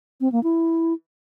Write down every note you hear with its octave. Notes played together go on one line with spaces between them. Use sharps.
C4
A#3
E4